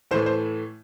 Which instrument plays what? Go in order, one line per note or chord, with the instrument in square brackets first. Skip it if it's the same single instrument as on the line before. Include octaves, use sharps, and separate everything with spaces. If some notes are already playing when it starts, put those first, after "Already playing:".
[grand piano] A2 E3 A3 C5
C5